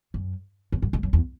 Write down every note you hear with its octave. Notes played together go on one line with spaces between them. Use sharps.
F#2
E2
F#2
G#2
F#2
E2